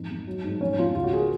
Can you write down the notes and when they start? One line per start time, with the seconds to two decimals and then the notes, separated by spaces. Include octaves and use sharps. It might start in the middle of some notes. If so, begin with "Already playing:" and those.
Already playing: F2 G#2 D#4
0.10 F2
0.27 F#3
0.44 G#2
0.61 F2 C#4
0.78 F2 F4
0.95 C#2 F4
1.04 F#4
1.13 G#4
1.21 A#4